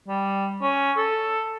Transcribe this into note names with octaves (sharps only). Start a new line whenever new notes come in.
G3
C#4
A4